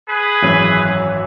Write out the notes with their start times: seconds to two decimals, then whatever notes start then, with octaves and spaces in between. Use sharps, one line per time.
0.08 G#4 B4
0.42 G#1 F#2 E3